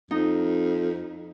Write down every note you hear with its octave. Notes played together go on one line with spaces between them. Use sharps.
F2 D#4